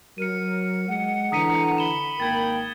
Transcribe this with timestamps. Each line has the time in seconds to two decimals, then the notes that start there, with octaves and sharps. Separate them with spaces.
0.18 F#3 A#4 C#7 D#7
0.88 G#3 F#5
1.32 D3 E3 A#5 D#6 B6 D#7
1.78 B5 E7 G7
2.20 G#1 A#3 A#4 G5 G#6 A6